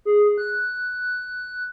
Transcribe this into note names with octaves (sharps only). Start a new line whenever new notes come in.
G#4
F#6